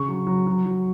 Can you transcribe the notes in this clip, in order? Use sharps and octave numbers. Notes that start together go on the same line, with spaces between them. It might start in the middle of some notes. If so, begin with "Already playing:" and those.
Already playing: C#3 C#6
F#3
F#3
F#3
F#3